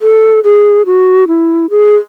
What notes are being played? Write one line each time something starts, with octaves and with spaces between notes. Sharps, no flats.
A4
G#4
F#4
E4
G#4